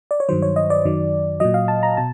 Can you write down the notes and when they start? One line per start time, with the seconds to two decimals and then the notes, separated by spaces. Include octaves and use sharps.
0.11 D5
0.20 C#5
0.29 G2 D#3 F#3 C5
0.42 C#5
0.56 D#5
0.70 D5
0.85 F#2 D#3 F#3
1.40 A#2 F#3 D#5
1.54 F5
1.68 A5
1.83 A#5
1.97 B2 A5